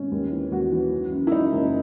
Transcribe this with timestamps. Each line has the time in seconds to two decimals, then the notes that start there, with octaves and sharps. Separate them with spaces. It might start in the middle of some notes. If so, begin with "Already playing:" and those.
Already playing: G#1 C#4
0.11 D#2
0.32 E3
0.51 D#2 F#4
0.72 E3
0.92 F#2
1.12 F#2
1.27 E4
1.31 F#2 D#4
1.52 F#1